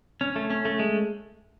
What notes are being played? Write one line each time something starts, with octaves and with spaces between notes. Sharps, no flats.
C#4
A3
C#4
A3
G#3